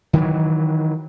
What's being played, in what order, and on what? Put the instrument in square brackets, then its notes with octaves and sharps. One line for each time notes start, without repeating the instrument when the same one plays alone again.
[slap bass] D#3 E3 F#3